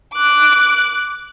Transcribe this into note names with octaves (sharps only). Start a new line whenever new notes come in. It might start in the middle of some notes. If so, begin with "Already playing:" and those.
D6 F#6